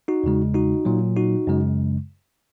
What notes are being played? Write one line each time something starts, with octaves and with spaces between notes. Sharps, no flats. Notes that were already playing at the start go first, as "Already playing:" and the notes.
D#4 F#4
E2 C#3 G#3
D#4 F#4
A#2 F#3
D#4 F#4
F#2 C#3 G#3